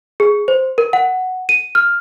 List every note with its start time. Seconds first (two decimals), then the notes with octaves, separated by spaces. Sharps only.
0.20 G#4
0.48 C5
0.78 A#4
0.93 F#5
1.49 D#7
1.75 F6